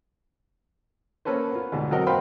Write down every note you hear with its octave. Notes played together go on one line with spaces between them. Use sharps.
A#3 C#4 A4 B4 C5
B3 F4
D2 G#2 B2
F#3 C4 F#4 A4 A#4 D#5
B4 C5 F5 G5 B5 C6